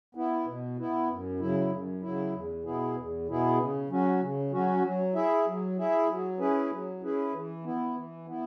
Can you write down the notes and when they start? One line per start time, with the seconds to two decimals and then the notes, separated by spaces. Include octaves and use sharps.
0.15 B3 E4
0.46 B2
0.77 B3 E4
1.09 F#2
1.40 C#3 F#3 E4
1.71 F#2
2.02 C#3 F#3 E4
2.33 E2
2.64 B2 B3 E4 G#4
2.96 E2
3.27 B2 B3 E4 G#4
3.58 C#3
3.89 F#3 C#4 F#4
4.21 C#3
4.51 F#3 C#4 F#4
4.83 F#3
5.15 E4 G#4 E5
5.46 F#3
5.77 E4 G#4 E5
6.08 F#3
6.39 C#4 E4 G#4 B4
6.71 F#3
7.02 C#4 E4 G#4 B4
7.33 E3
7.64 B3 E4
7.95 E3
8.27 B3 E4